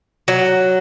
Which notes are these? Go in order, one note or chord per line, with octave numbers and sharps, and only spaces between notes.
F#3